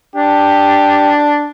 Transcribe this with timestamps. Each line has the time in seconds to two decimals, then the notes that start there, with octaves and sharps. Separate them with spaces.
0.15 D4 G4